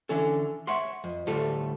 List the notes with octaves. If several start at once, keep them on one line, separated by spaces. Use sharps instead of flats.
D3 E3 C#4 A4
C#5 E5 F#5 C6
F2
D2 A2 G3 F4 A4